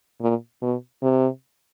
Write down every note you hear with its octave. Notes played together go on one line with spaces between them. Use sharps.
A#2
B2
C3